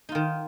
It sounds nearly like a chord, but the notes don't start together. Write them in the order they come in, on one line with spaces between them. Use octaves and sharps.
D#4 F4 D#3